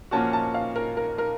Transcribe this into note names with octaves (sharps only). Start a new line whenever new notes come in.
A#2 F3 A#3 C#4 F#4 A5
A5
F5
A#4
A#4
A#4